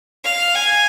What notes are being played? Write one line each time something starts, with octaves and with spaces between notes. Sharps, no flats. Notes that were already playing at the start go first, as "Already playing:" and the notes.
F5
G#5